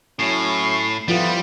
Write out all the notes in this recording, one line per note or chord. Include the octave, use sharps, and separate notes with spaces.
A2 F#3 C#4 E4 C7
A1 A2 F3 G3 B3 E4 F4